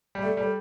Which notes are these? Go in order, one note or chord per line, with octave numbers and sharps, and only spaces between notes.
G3
A3 D5
G3
A4